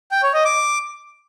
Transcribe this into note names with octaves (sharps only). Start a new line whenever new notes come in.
G5
C#5
D#5
D6